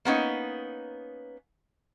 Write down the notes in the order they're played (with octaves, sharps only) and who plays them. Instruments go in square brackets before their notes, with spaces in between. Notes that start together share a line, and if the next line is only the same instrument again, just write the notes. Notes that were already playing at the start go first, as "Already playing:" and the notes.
[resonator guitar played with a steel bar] A#3 B3 C#4 D#4